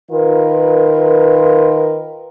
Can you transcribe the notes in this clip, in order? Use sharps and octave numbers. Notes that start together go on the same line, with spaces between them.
D#3 F4 A#4 B4